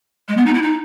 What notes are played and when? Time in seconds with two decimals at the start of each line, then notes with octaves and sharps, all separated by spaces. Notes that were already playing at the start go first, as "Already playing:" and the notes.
0.28 G#3
0.37 B3
0.46 D#4
0.54 E4
0.63 D#4